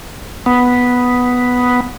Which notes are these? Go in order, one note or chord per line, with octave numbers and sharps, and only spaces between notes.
B3